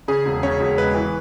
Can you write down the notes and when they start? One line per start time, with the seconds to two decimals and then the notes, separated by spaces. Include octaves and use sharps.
0.08 C#3 G#4
0.26 E1
0.43 C#3 C#5
0.60 E1
0.78 G#3 B4
0.94 E3